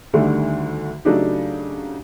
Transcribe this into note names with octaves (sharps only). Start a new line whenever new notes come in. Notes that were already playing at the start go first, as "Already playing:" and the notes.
D2 D3 D#3 G3 A3
C#3 F#3 A3 D4 D#4 G4